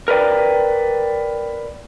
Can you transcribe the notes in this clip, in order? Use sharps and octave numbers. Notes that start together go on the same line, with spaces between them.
A#4 B4 D5 G5